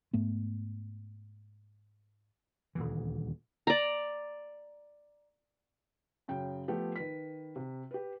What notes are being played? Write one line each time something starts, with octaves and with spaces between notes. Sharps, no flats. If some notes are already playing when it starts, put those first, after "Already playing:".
G#2 A3 B3
D#1 D2 E3
D5 A#5
F#2 C#3 G5
F3 A3 B3 G4
D#3 B4 B6
C3
G4 B4